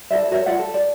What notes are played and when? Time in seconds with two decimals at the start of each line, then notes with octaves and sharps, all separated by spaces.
0.11 E4 A4 D5 E5
0.31 F#4 A#4 C#5 E5
0.46 F4 D5 E5 F#5
0.59 A4
0.74 D5